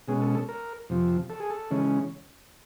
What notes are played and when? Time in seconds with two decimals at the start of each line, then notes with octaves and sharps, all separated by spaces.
0.08 B2 G#3 C#4 G#4
0.21 A4
0.35 A4
0.49 A#4
0.89 F2 C3 F3
1.30 A4
1.40 G#4
1.50 A4
1.71 C#3 E3 G#3 C#4